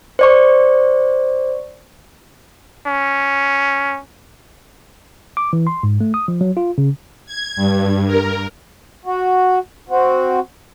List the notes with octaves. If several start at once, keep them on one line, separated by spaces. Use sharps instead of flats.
C5 D5 C#6
C#4
D6
E3
C6
G#2
A3
D#6
F3
F#3
F4
C#3
G#6
G2
A#4
F#4
C4 F#4